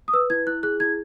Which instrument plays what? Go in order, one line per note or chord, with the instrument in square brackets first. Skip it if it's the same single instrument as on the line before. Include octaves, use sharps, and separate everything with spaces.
[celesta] D#6
B4 E6
E4 G#6
E4 F#6
G#4 F#6
E4 G#6